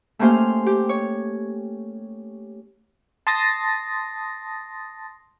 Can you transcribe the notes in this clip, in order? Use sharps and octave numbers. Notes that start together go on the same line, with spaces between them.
A3 A#3 C#4 G4 C5 F5
G4
C#5
A5 C6 D#6 A6 A#6